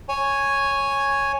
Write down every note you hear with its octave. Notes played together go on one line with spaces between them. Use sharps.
C#5 G#5